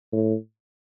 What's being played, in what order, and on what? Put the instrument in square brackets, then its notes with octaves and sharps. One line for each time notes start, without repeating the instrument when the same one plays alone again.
[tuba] A2